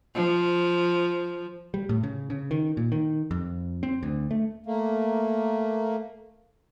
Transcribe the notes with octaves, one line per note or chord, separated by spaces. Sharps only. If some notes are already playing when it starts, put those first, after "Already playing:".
F3
G3
A2
C#3
C#3
D#3
A#2
D#3
F2
C4
D2
A3
A3 A#3